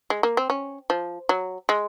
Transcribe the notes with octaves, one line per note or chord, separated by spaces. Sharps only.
G#3
A#3
C4
C#4
F3
F#3
G#3